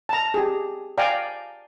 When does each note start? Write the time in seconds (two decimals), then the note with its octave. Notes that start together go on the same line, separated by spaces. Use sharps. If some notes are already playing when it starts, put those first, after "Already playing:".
0.09 A5 A#5
0.34 G4 G#4
0.98 D5 F5 G5 G#5 A#5